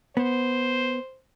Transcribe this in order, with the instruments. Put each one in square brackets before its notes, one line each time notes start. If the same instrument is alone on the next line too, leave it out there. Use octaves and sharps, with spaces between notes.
[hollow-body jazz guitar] B3 [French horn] C5